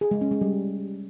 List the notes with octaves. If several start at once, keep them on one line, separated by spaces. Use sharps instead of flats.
G#4
G#3
C#4
G#3
G3